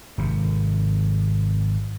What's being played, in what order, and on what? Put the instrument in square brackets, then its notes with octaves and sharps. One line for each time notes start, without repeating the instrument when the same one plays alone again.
[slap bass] G#1 C3